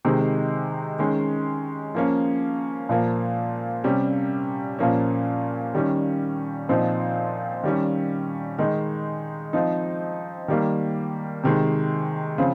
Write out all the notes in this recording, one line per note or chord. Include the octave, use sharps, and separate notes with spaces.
C3 D#3 G#3 D#4
D#3 G#3 C#4
F3 A#3 C#4
A#2 F3 A#3
C3 G3 C#4
A#2 F3 A#3 C#4
D#3 G3 C#4
A#2 F3 C4 D#4
D#3 G3 C#4
D#3 G#3 D#4
F3 C4 D#4
D#3 G3 A#3
C3 D#3 G#3
C#3 F3 C4